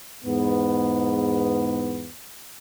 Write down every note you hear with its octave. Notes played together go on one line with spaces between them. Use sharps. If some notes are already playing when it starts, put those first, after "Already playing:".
E2 G#2 B3